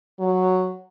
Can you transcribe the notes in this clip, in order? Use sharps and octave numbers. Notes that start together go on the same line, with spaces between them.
F#3